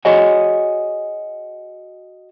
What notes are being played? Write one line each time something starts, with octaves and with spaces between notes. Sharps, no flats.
F#4 G#4 C#5 D#5 F#5 G#5